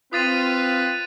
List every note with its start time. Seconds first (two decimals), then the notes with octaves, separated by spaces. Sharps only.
0.13 C4 F4 B4 D#6 A6 D#7